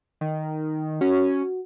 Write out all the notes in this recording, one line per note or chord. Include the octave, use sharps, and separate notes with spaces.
D#3
C#4 F#4